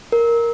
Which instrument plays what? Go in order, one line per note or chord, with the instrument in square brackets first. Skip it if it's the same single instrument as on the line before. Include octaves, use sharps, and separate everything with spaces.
[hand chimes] A#4